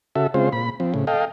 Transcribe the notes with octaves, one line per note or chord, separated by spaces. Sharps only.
C#3 F#4 A4 E5
C#3 G#3 C4 F4 C5
A#2 B5
F3 C4
A2 C#3
A4 D#5 F5 G5